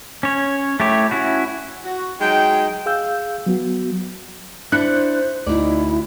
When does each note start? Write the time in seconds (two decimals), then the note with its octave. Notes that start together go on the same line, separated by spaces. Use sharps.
0.23 C#4 C#5
0.80 A3 E4 G4 C#5
1.11 C#4 E4 F#4
1.83 F#4
2.21 F#3 G#3 D#4 G5
2.86 G#4 F5 E6 G6
3.46 F#3 B3 F#4
4.72 D4 E4 C5 F#6 C#7
5.46 D2 D#4 E4 D5